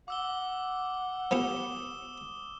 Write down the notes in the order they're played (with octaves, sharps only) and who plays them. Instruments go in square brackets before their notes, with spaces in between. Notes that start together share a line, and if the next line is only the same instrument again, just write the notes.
[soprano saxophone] F#5 [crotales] D6 E6 G7
[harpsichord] F3 B3 G4 [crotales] D#6 E7 G7